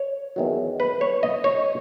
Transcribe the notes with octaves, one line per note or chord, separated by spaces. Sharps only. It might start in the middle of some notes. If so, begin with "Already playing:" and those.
Already playing: C#5
E2 D#3 F#3
B4
C#5
D#5
C#5